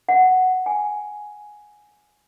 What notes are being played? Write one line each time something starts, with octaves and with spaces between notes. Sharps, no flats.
F#5
G#5